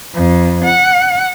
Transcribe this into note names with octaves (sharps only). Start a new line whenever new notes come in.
F2
F#5